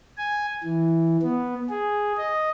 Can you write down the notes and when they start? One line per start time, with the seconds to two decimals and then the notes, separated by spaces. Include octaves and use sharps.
0.17 G#5
0.64 E3
1.22 B3
1.69 G#4
2.17 D#5